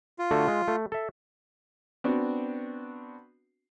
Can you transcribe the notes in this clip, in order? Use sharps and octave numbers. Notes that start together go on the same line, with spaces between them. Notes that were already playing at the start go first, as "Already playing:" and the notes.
F4
D3 A3 F#4
G#3
A3
A4 E5
B3 C4 D4 F#4